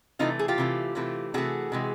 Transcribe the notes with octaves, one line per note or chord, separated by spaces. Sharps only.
C3 E3 A3 D#4 F4
G#4
F4 G4
C3 E3 A3
C3 E3 A3
C3 E3 A3 F#4 G#4
C3 E3 G#3